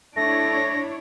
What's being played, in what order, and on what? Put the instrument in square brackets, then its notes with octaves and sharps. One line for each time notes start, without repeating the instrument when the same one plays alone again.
[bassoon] A3 [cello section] D4 E4 C#5 [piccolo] A#6